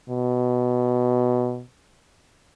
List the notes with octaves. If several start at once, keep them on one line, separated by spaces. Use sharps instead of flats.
B2